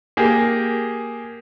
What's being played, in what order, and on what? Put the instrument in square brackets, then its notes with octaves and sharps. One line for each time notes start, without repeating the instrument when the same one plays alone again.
[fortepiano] A#3 G4 G#4